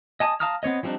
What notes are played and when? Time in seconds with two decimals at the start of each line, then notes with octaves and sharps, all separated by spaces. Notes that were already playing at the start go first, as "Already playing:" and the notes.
0.20 D#5 G#5 A5 D#6
0.40 F5 A5 A#5 D#6 F6
0.63 B3 C4 C#5 D#5
0.83 F3 G3 C4 D4 D#4